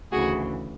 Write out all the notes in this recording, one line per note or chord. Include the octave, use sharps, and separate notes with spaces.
D2 C#3 E3 F#4 G#4